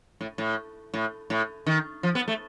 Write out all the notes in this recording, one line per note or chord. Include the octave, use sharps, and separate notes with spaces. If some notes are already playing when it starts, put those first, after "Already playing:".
A2
A2
A2
A2
D#3
F3
B3
A3